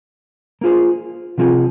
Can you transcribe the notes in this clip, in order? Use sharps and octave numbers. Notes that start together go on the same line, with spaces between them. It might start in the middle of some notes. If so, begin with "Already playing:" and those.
A#3 F4 G#4 C5
C3 F3 C4 F4 G#4